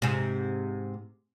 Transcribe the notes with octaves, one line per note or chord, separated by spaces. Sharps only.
G#2 C3